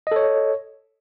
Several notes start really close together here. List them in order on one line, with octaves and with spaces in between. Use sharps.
D#5 A4 C#5